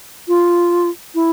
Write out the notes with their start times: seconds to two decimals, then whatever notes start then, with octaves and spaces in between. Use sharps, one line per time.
0.28 F4
1.15 E4